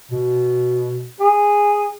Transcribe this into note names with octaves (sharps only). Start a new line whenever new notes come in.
B2
G#4